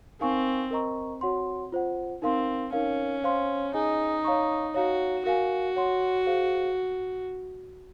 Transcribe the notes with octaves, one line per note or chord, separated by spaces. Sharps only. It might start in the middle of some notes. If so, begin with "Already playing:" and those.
C4 D#4 A#4 F5 G#5 C#6
A#4 D#5 A#5 C#6
F#4 C#5 F#5 C6
F4 C5 F#5
C4 D#4 A#4 F5 C6
C#4 D#4 A#4 F5
C5 F5 C6
D#4 G#4 D#5 G#5
C#5 F5 A#5 C#6
F#4 C#5 F5 A#5
F#4 A#4 F5 G#5
C#5 F#5 C6
G#4 C5 F5